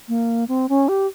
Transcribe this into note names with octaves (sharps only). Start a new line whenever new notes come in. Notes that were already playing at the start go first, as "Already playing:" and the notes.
A#3
C4
C#4
G4